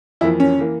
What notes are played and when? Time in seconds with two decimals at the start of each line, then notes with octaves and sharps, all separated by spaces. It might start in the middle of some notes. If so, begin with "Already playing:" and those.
0.21 F2 E3 A#3 E4
0.40 C#4
0.59 E3 A#3